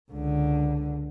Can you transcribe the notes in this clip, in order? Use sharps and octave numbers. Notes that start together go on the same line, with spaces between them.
C#2 D3